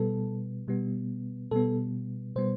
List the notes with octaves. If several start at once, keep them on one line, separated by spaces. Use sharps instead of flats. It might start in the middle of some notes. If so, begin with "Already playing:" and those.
Already playing: B2 G3 B3 A4
B2 G3 B3
B2 G3 B3 A4
B2 G3 B3 C5